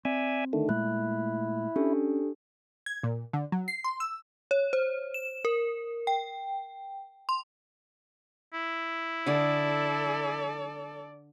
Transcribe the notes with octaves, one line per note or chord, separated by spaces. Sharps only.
C4 D5 E5 G#5
D3 D#3 A3
A#2 G#3 A3 E4 F#6
C#4 D4 G4 A4
G#6
A#2
D3
F#3
C7
C6
E6
C#5
C5
E7
A#4
G5
C6
E4
D3 G#4 A4 D5